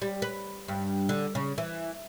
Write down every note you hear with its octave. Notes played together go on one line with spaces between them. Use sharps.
G3
B4
G2
D3
C#3
E3